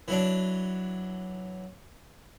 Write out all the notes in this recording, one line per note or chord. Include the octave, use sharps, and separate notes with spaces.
E3 F#3 D4